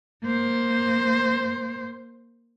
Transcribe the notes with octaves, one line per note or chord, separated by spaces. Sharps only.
A#3 C5